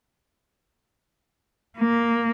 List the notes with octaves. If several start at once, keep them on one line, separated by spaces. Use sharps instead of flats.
A#3